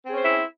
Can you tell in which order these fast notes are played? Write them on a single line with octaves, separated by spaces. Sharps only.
C4 G#4 C#4 C5 E4